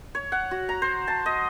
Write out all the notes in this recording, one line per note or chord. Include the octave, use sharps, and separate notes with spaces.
C#5
F#5
F#4
A#5
C5
A5
D#5